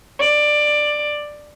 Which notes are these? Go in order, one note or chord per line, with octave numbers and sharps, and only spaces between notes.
D5